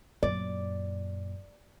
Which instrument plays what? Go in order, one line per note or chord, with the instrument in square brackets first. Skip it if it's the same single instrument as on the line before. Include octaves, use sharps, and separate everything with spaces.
[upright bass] F#2 A#2 [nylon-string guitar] D5